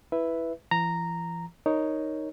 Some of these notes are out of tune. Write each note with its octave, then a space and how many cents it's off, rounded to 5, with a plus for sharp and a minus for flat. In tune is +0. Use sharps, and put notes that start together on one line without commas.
E4 +0 B4 +0 E5 +0
E3 +45 A#5 -5
D#4 +0 A#4 +0 C#5 +0